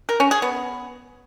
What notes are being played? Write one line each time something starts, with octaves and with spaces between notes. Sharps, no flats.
A#4
C#4
G#4
B3